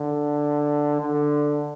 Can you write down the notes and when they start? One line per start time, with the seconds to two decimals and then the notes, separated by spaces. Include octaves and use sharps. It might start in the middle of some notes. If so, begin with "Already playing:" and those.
Already playing: D3
1.00 D3